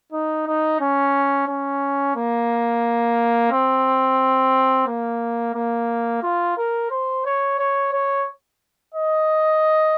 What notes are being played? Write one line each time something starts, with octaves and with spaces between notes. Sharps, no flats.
D#4
D#4
C#4
C#4
A#3
C4
A#3
A#3
F4
A#4
C5
C#5
C#5
C#5
D#5